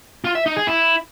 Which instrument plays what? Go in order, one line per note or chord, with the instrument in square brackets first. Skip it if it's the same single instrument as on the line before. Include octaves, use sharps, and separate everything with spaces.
[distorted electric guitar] F4
E5
D#4
G#4
E4